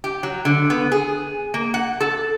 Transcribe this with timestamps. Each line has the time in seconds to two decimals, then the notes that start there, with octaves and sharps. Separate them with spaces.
0.04 G4
0.23 F#3
0.45 D3
0.70 B3
0.92 G#4
1.54 A#3
1.74 F#5
2.00 A4